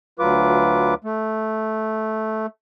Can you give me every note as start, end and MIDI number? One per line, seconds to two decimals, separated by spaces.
0.19 0.94 38
0.19 0.94 54
0.19 0.94 65
0.19 0.94 71
0.19 0.94 86
1.04 2.46 57